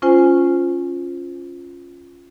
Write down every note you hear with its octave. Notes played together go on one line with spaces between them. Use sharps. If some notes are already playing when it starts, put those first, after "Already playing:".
C#4 F4 C5 G#5